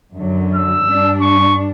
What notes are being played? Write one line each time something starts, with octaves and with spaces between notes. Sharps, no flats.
F#2 D3 F#3
E6
G2 G3 D4
C#6